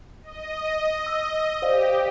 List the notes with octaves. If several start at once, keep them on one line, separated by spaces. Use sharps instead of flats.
D#5
E6
G4 C5 D5 F5